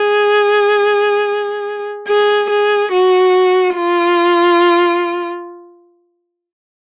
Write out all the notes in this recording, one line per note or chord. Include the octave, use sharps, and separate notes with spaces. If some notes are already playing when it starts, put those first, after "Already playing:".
Already playing: G#4
G#4
G#4
F#4
F4